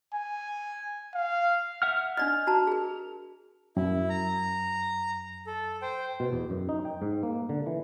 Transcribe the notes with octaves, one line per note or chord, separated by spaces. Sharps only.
G#5
F5
E5 F#5 F6
D4 D5 D#5 F6
F#4 A5 A#5
G#4 A#4
F#2 E4
A#5
A4
C5 G5
B2
E2
F#2
D#4
G5
G#2
A#3
D3
E3